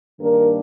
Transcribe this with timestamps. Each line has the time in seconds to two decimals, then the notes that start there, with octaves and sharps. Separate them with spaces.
0.20 G2 D#3 A#3 D4 A#4